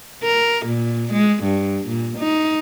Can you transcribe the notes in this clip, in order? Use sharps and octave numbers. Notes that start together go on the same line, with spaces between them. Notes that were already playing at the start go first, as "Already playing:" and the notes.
A#4
A#2
G#3
G2
A#2
D#4